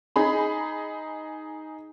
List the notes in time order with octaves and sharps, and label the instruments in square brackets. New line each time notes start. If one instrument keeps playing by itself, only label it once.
[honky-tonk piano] D#4 G#4 B5